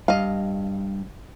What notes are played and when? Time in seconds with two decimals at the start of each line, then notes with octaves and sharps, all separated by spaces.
0.08 G2 D#5 F5